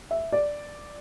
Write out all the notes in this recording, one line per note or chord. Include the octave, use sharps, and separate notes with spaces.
E5
D5